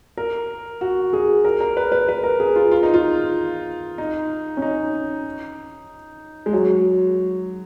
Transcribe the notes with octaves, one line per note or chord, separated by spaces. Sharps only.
A#4
F#4
G#4
A#4
A#4
B4
B4
B4
A#4
G#4
F4
F4
D#4
F4
D#4
C#4
D#4
G#3
F#3